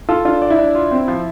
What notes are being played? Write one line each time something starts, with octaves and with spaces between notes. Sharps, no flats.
F4 A4
D4 F4
D5
E4
D4
F4
C4
F3